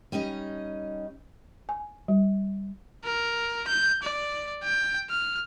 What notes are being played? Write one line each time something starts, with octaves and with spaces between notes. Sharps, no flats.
G3 C#4 D#4 D#5
G#5
G3
A#4
G6
D5
G5
F6